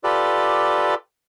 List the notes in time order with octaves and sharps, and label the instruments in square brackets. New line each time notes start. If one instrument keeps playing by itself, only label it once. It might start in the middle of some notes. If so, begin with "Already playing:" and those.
[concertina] F4 G4 A4 B4 D5